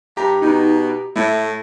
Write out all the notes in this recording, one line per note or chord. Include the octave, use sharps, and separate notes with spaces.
G2 G4 A#5
B2 D#4
A2 A3 E4